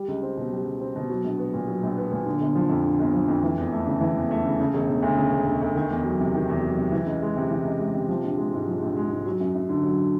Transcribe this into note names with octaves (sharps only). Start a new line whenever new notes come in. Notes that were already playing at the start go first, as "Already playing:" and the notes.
Already playing: G3
C#2
C4
B2
G3
C#2
C4
B2
F#3
A#1
B3
A#2
F#3
A#1
B3
A#2
D3
G1
F3
F2
D3
G1
F3
F2
E3
E2
A3
C#3
E3
E2
A3
C#3
C#3
E1
E1
D2
C#3
E1
E1
D2
D#3
E2
F#3
C3
D#3
E2
F#3
C3
E3
C#2
G#3
C3
E3
C#2
G#3
C3
F3
A#1
G#3
G#2
F3
A#1
G#3
G#2
F#3
F#2
F#2
D3
F#3